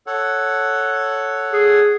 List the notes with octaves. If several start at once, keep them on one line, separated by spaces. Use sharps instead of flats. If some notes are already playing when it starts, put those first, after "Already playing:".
A4 C#5 F#5
G#4